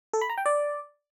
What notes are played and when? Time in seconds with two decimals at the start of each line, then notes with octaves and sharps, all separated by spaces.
0.13 A4
0.21 B5
0.29 A#5
0.38 G5
0.46 D5